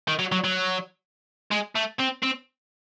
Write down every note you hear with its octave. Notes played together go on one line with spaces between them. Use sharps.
D#3
F#3
F#3
F#3
G#3
A3
C4
C4